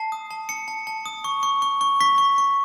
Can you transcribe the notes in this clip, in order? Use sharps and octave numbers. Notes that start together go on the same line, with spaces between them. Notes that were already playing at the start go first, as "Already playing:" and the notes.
Already playing: A5 C7
D#6
A5
A5 C#7
A5
A5
D#6
C#6
C#6
C#6
C#6
C#6 B6
C#6
C#6